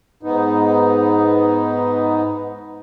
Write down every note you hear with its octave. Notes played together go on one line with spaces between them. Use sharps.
G#2 B3 D#4